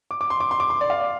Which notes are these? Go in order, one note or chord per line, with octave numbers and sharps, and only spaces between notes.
D6
D6
C6
D6
C6
D6
C6
D5
F5
D5